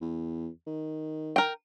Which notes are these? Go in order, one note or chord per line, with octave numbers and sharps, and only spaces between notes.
E2
D#3
A#4 G5